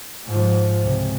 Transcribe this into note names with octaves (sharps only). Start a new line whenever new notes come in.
G#2 F3
C#2 C3